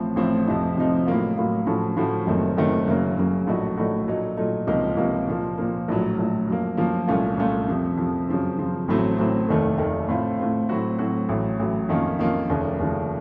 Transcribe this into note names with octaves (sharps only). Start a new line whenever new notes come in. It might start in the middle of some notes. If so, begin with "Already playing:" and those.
Already playing: A1 A2 F3 C4
A1 A2 F3 C4
F2 C3 F3 C4 D#4
F2 C3 F3 C4 D#4
A2 F#3 A#3 F4
A2 F#3 A#3 F4
A2 F3 A3 C#4 F#4
A2 F3 A3 C#4 F#4
F#1 F#2 D#3 A3 C4
F#1 F#2 D#3 A3 C4
F#1 F#2 C#3 F#3 A#3
F#1 F#2 C#3 F#3 A#3
A#1 A2 A3 D#4 F#4
A#1 A2 A3 D#4 F#4
A#2 F#3 A3 D#4
A#2 F#3 A3 D#4
C#2 C3 F3 A#3 D#4
C#2 C3 F3 A#3 D#4
A#2 F3 A#3
A#2 F3 A#3
A#1 A2 F#3
A#1 A2 F#3
F#2 F3 A#3
F#2 F3 A#3
C2 A#2 A3 C#4 F4
C2 A#2 A3 C#4 F4
F2 C3 F3
F2 C3 F3
F#2 C#3 F3 C4
F#2 C#3 F3 C4
A1 A2 F#3 A3 C4
A1 A2 F#3 A3 C4
F1 D#2 D#3 A3
F1 D#2 D#3 A3
A2 A3 C4 F4
A2 A3 C4 F4
A2 F#3 C4 F#4
A2 F#3 C4 F#4
A1 A2 F#3
A1 A2 F#3
F2 D#3 A#3 C#4 F4
F2 D#3 A#3 C#4 F4
F1 D#2 C#3 F3
F1 D#2 C#3 F3